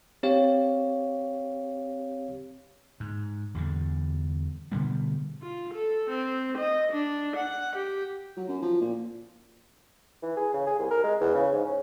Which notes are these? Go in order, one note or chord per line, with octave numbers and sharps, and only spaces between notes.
C4 G4 C#5 F5
G#2
E2 G2 D3
B2 D3 G3 B3
F4
A4
C4
D#5
D4
F#5
G4
F#3
F#2
F3
A#2
E3
G#4
C#3
G#4
C2
A#4
G#3
E2
C#3
G#2
C#4